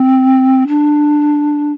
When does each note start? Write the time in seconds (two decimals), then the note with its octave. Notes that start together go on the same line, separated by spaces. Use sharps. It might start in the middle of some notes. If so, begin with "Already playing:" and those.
Already playing: C4
0.67 D4